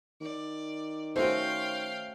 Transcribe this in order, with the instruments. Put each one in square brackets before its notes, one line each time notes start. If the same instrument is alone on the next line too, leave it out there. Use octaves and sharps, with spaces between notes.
[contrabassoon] D#3 [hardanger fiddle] D5
[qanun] A3 C#4 F#4 [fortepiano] C5 [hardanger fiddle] F5 G5